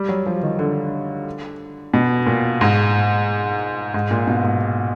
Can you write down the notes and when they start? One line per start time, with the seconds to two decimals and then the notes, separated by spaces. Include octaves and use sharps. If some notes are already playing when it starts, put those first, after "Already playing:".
Already playing: G3
0.09 F#3
0.26 F3
0.43 D#3
0.59 D3
1.94 B2
2.26 A#2
2.61 G#2
3.94 G#2
4.11 A#2
4.27 B2
4.44 G#2